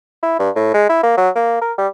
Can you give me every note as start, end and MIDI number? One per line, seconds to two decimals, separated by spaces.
0.23 0.37 64
0.39 0.50 43
0.56 0.74 45
0.74 0.86 56
0.89 1.03 64
1.03 1.17 58
1.17 1.29 54
1.36 1.59 58
1.62 1.72 70
1.78 1.88 55